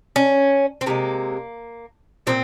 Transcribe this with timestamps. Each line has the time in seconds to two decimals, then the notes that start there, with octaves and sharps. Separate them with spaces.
0.16 C#4
0.81 C4
0.86 C3 F3 G#3 A#3
2.27 A#2 F3 C4